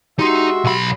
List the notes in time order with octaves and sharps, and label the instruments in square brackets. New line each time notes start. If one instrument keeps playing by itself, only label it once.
[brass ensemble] G#3 F#4 E5 [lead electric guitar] D#4 [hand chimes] G4 C6 C7
[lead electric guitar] B1 B5